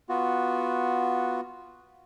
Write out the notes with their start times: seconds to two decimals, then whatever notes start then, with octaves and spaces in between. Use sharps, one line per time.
0.09 B3 F4 F#4